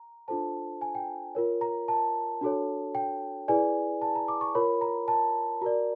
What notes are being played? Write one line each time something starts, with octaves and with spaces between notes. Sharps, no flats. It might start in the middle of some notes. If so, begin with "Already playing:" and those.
Already playing: A#5
D4 F4 A4 C5 A5
G#5
G5
F4 A#4 C#5
A#5
A5
D4 F#4 A4 C#5
G5
E4 G#4 B4 D5 G#5
A5
A#5
D6
C#6
F4 A#4 C#5 B5
A#5
A5
F#4 A#4 D5 A#5